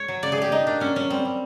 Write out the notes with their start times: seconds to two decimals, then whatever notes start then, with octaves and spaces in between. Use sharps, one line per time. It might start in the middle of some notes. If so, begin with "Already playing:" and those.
Already playing: C#5
0.08 F#3
0.22 C#3 D5
0.32 G#4
0.37 A3 G4
0.52 A3 D#4
0.66 A#2 D4
0.80 F#3 C#4
0.95 F#3 C#4
1.10 G3 C4
1.25 G3